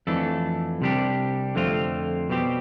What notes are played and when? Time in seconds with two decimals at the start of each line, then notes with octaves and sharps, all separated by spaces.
0.07 F2 E3 A3 D4 A4
0.81 C2 C3 G3 D4 G4
1.55 F2 D3 A3 C4 F4
2.30 B2 G3 C4 G4